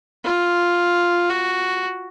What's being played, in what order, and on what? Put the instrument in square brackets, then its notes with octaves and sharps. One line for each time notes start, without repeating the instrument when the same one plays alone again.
[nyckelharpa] F4
F#4